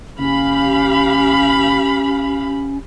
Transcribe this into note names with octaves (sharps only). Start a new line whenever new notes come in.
F#1 C#4 G4 F5 B5